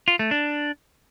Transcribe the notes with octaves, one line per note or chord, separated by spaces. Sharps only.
F4
A3
D4